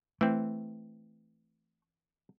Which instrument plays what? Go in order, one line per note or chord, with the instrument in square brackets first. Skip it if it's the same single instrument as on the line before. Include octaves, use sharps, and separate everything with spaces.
[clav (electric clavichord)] E3 C4 [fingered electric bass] A3